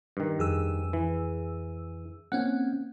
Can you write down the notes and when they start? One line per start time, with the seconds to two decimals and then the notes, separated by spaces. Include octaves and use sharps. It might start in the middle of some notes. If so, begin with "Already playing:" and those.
0.17 G2 D#3
0.39 F2 G#4 E6
0.93 E3
2.32 A#3 C4 C#4 F#5